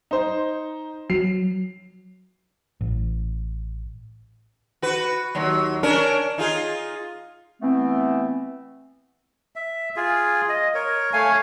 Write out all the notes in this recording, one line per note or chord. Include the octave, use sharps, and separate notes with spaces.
D#4 C5
F#3 C7
A1
F#4 B4
D#2 F#3
C#4 D4 A#4
D#4 F4 G#4
E3 A3 B3 C4
E5
F4 G#4
D#5
A#4 C#5
A3 C#5 F5 G#5